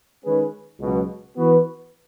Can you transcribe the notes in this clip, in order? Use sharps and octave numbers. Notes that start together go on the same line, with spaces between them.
D#3 G#3 C#4 G#4 B4
C#2 B2 F#3
E3 B3 F#4 B4